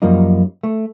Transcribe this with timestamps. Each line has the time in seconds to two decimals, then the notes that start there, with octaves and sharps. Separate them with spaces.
0.02 F#2 F3 G3 A#3 D#4
0.63 A3